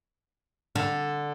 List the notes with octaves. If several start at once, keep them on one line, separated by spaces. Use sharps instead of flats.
D3